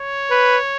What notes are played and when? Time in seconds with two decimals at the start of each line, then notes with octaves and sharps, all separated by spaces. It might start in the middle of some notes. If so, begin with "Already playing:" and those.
Already playing: C#5
0.31 B4